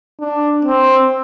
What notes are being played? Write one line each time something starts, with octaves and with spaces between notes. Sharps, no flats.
D4
C4